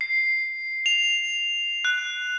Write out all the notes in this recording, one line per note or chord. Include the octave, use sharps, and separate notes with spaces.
C7
F7
F#6